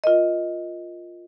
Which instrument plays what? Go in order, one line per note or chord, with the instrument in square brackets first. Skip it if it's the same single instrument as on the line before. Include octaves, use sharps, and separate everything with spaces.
[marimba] F4 A#4 D#5